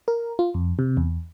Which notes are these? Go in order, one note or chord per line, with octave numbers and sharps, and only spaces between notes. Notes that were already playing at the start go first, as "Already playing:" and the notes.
A#4
F4
F2
C3
E2